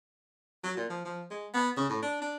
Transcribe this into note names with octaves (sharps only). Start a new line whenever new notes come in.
F#3
A#2
F3
F3
G#3
B3
C#3
A2
D4
D4